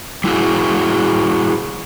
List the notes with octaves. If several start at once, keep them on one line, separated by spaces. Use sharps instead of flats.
G3 E4 F#4 G#4